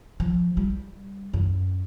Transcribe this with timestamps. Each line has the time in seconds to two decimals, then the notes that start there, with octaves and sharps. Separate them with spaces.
0.20 F3
0.57 G3
1.33 F#2